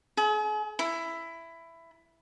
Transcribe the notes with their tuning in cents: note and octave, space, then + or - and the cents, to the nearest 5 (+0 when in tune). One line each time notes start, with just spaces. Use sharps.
G#4 +40
E4 +10